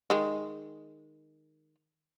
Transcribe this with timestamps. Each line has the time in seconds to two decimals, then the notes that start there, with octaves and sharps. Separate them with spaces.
0.10 D#3 G#3